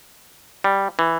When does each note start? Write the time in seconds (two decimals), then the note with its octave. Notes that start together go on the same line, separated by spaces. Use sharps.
0.64 G3
0.99 E3